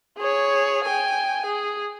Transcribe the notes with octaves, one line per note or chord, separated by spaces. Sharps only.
G#4 C#5
G5 G#5
G#4